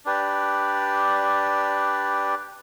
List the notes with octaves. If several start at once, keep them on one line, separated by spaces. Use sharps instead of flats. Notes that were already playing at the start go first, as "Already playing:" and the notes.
D4 G4 B4 D5